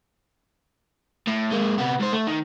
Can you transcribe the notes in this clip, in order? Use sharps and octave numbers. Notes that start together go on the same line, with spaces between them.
A2
G#3 A#3
C3 B3
G#2 C5
A3
D#3